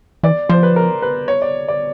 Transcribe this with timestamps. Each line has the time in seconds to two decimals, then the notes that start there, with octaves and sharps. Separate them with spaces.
0.23 E3 D5
0.49 F3 C5
0.63 B4
0.76 A#4
1.02 B4
1.28 C#5
1.42 D5
1.68 D5